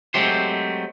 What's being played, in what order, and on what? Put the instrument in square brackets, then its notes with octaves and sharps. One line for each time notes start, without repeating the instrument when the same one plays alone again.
[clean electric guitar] F#3 G#3 A3 C4 G4 C5